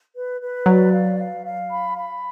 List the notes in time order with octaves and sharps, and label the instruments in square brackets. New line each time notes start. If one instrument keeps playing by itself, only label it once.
[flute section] B4
B4
[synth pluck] F#3 [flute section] D5
[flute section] F5
F5
F5
B5
B5